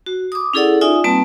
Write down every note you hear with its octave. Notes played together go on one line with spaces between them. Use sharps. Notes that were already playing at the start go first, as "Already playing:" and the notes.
F#4
D6 D#6
C#4 E4 G#4 A4 D5 F#5
D#4 F4 D5 E5 G#5 D#6
G3 A#3 C4 B4 A5